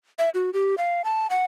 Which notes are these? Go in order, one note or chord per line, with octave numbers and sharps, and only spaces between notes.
E5
F#4
G4
F5
A5
F#5